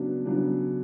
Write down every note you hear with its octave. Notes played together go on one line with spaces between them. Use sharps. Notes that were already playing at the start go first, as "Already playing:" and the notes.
Already playing: C#3 F#3 B3 D4
C#3 F#3 B3 D4